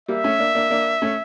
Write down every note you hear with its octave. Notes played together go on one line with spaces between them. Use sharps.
G3 A#3 E5
A3 C#4
A#3 D4
A#3 D4
A#3 D4
A3 C#4